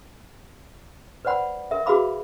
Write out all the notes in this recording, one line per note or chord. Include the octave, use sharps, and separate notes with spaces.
B4 C5 D5 F#5 B5
A#4 E5
F#4 G#4 B4 F5 B5 D6